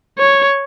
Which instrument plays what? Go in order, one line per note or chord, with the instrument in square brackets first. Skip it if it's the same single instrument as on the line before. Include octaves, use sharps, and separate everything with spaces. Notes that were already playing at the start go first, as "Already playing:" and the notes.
[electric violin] C#5